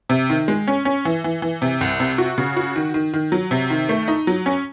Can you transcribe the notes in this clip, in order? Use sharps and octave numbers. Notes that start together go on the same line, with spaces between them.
C3
D#3
G#3
C#4
C#4
E3
E3
E3
C3
C2
C3
F#4
C#3
F#4
D#3
D#3
D#3
F#3
C3
D#3
A3
D#4
F#3
C#4